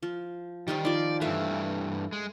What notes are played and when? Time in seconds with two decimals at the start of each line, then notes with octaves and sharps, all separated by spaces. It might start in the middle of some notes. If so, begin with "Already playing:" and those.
0.03 F3
0.68 D#3 G3 D#4 C5
0.85 D#3 F3 D5
1.21 G2 E3 A3 E5 F5
2.12 G#3